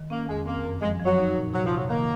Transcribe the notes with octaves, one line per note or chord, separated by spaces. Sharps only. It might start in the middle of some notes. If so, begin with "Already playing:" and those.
Already playing: D#3
A#3 C#4
F2 G#3
A#3 C4
F#2
F3 G#3
F3
F#3
D#4
A#2
C3 F#3
F3
C3
F#3
D#3 A#3